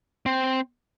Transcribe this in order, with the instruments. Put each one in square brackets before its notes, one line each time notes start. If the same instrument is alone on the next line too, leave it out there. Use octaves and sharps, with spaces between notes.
[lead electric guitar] C4